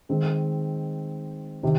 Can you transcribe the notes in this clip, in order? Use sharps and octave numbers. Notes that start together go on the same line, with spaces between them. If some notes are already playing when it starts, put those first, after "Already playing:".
D#3 G#3 C4
C3 D#3